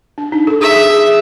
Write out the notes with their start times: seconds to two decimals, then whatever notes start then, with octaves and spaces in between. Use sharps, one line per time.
0.18 D4
0.32 D#4
0.47 A4
0.61 G#4 E5
0.76 G#4
0.90 G#4